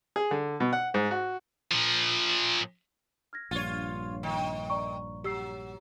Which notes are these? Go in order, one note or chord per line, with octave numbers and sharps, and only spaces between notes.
G#4
D3
B2
F#5
G#2
F#4
A#2 F3
F6 G#6 A#6
A#1 G2 F4 C#5 A6
D#3
D5 A#5 C#6
F#3 G4 E6 C7